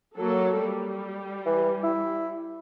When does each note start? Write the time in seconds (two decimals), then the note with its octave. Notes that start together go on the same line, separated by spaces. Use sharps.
0.17 F#3 A#3 A4
0.59 G3
1.45 E3
1.83 E4